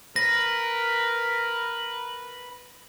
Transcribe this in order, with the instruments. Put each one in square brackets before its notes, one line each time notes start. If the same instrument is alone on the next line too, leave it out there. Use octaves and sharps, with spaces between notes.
[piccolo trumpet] A#4 [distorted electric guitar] B4 [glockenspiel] A#6